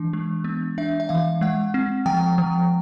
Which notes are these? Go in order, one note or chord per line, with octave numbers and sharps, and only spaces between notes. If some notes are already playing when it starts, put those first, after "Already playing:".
Already playing: E3 G#3 D4
G#3
B3
D4 E5
E5
E3 F5
G#3 F#5
C4
F3 G5
F3